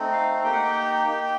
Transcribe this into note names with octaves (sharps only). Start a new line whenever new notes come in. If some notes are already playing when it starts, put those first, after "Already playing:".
Already playing: A3 C4 D#4
F5
A#3 D#4 G4 G5
F#5
G5
A#3 D#4 G4